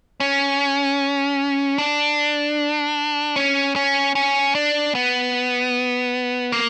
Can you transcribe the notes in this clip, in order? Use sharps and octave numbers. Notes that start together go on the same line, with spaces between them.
C#4
D4
C#4
C#4
C#4
D4
B3
A#3